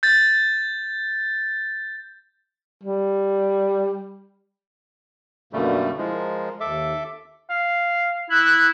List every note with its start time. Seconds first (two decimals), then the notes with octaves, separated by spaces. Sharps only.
0.03 G6 A6
2.83 G3
5.53 F#2 B2 D3 G3 A3 A#3
5.98 F3 G#3 E4
6.13 A#4
6.60 D#2 A4 E5 D6
7.50 F5
8.30 E4 F#6